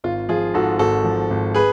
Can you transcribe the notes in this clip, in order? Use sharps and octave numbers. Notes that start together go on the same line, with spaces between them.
G#1 F4
F3 F4 G#4
G#2 F#4 A4
G#1 F#4 A4
F3
G#1
G#4 B4